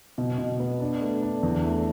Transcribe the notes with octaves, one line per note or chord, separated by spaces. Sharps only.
B2
B2
B3
D4
A3
D4
E2
A3